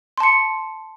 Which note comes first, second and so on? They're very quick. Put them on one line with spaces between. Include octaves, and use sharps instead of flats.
C6 A5 C#7